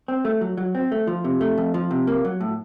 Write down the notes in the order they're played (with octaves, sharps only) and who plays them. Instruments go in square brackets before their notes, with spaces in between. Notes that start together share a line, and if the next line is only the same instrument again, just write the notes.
[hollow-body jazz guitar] C4
A3
F#3
F#3
C4
A3
F3
C3
A3
F2
F3
C3
A#3
F#3
A2